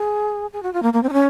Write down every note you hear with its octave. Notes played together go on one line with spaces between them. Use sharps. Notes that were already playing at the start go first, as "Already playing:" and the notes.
Already playing: G#4
G#4
F#4
F4
A#3
A#3
C4
D#4
C#4